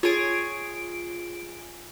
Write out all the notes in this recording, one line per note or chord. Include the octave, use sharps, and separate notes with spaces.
F4 G#4 C#5 D7